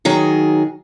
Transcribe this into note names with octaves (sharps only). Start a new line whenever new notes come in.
D#3 F#3 G#4